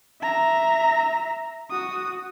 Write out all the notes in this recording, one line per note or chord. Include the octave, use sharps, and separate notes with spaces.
E5 A#5
F#4 D#6